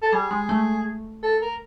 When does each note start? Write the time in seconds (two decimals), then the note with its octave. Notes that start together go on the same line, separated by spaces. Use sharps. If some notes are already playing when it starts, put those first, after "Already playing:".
0.02 A4
0.13 G3 G#4
0.31 G#3
0.49 A3
1.23 A4
1.42 A#4